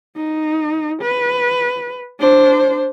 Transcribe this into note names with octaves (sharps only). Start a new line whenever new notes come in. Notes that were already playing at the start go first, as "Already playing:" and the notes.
D#4
B4
D4 C5